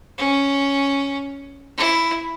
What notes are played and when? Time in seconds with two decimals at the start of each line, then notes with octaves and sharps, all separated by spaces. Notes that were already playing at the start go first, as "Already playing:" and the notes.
0.18 C#4
1.78 E4